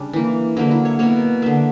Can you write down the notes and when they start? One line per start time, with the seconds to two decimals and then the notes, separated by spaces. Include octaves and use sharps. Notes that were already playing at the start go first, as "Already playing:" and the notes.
Already playing: C#3 G3 D4
0.13 E3 A#3
0.57 D3 F#3 A#3 E4
0.71 E4
0.85 C#5
0.99 B2 A#3 C#5
1.42 D3 A#3 E5